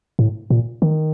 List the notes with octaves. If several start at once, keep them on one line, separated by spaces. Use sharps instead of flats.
A2
A#2
D#3